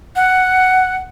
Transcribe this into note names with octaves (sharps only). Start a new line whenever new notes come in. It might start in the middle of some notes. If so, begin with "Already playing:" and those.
F#5